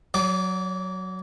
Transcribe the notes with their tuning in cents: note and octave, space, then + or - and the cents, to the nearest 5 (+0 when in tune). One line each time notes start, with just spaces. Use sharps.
F#3 +0 D5 -30 D6 +0